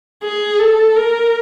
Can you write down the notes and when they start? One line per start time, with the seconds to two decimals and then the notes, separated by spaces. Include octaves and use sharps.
0.23 G#4
0.59 A4
0.96 A#4